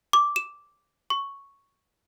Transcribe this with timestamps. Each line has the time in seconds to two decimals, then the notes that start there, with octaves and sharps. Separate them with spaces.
0.13 D6
0.36 E7
1.10 C#6